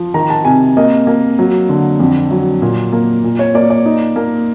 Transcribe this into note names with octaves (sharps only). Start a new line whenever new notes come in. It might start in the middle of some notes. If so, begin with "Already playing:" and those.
Already playing: F3
D#3 A#5
A5
C3 G#5
A#3 D#5
A#3
F#3
D3
F2
F#3
A#2
A#3
A#2
C#5
A#3 D5
D5
D#4
A#3